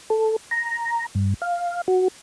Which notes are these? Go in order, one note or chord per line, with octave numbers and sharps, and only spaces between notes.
A4
A#5
G2
F5
F#4